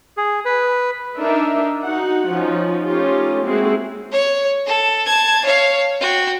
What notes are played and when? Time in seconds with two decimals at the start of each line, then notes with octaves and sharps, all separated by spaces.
0.17 G#4
0.45 B4
1.18 D4 D#4 A#4 E5
1.84 D#4 F#4 F#5
2.29 F3 C#4 D#4
2.85 A3 C#4 D#4 F4 G4
3.44 G#3 A#3 C4 E4 F#4 G#4
4.12 C#5
4.66 A4
5.06 A5 G#6
5.45 C#5 F5
6.01 F#4 G5